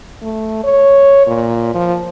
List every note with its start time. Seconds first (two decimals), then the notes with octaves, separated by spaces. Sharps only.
0.22 A3
0.64 C#5
1.27 A#2
1.74 F3